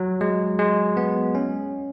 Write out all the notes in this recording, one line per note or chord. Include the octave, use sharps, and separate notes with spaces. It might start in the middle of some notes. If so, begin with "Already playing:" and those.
Already playing: F#3
G#3
G#3
B3
C#4